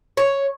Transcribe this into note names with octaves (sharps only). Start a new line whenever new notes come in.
C#5